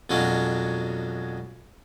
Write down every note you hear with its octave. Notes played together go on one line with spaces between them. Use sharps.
F2 B2 F#3 G#3 C#4 D4